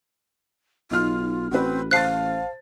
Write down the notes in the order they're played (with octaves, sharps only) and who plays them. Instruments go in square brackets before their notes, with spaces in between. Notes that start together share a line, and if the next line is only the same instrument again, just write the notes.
[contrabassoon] B1 [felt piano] D#4 F6 [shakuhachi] F4
[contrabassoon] A1 [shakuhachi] C4 [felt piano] F#4 B4
[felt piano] C5 A5 A6 [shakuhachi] F5 [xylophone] F#6 C7